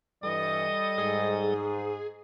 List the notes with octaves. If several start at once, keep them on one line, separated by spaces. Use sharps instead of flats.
G2 E3 G3 A4 D#5 D#6
G#2 G#4